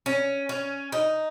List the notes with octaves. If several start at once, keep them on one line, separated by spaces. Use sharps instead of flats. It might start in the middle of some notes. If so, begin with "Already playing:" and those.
C#4
C#4
D#4